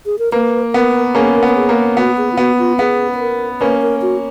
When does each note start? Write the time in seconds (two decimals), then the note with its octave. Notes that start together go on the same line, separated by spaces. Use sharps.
0.06 G#4
0.19 A#4
0.32 A#3 B4
0.74 B3 A#4
1.15 A#3 C#4 G#4
1.35 A#4
1.43 B3
1.49 A#4
1.56 G#4
1.69 A#3
1.97 B3 F#4
2.18 G#4
2.32 F4
2.37 B3 F#4
2.59 F4
2.79 B3 G#4
3.14 B4
3.20 A#4
3.61 A#3 C#4 B4
3.82 A#4
4.02 F#4